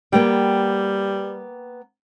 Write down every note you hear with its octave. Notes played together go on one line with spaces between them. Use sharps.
G3 A#3 B3 G5